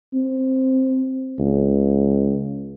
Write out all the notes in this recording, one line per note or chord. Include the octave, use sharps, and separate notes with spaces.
C4
C#2